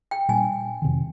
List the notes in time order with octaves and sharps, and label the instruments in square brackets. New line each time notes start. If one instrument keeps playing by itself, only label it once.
[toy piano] G5
[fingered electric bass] A#2 G3 D4 [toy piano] G#5
[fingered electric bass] F2 C3 D#3